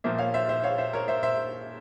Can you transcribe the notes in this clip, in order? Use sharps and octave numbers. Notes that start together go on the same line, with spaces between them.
A#2 F3 A#3 C5 E5
C#5 F5
C5 E5
C5 E5
C#5 F5
C5 E5
A#4 C#5
C5 E5
C5 E5